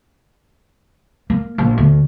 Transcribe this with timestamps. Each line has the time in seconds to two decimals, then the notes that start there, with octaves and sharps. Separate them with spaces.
1.30 A#3
1.58 A#1
1.78 D2